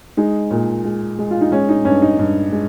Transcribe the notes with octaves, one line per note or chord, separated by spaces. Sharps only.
G#3 D#4
A#2
G#3
G#3
F4
D#4
G#3 C#4
D#4
G2 C#4
D#4
G2
G#3